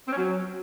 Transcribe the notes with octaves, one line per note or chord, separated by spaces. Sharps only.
C4
C#4
F#3